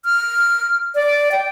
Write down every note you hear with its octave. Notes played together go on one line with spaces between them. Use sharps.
F6
D5
G5